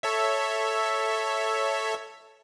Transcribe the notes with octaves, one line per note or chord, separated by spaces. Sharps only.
A4 C#5 E5